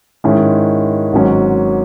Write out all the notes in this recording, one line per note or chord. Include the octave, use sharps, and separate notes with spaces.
G#2 D#3 G#3 C#4 E4
G#1 G#2 F#3 C#4